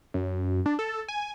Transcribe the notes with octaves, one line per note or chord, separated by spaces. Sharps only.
F#2
D4
A4
G#5